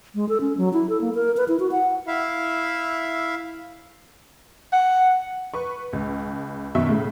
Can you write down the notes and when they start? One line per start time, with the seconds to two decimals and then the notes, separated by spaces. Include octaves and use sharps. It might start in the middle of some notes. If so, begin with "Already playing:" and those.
0.15 G#3
0.29 A4
0.41 C#4
0.57 F#3
0.73 E4
0.89 A4
1.01 A#3
1.15 A#4
1.37 B4
1.48 E4
1.60 F#4
1.72 F#5
2.07 E4 E5 F5
4.73 F#5
5.54 B4 C#6
5.93 C#2
6.75 F#2 B2 D#3 E5 C#6
6.89 A2 C#3